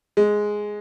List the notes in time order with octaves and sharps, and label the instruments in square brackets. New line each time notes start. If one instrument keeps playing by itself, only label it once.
[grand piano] G#3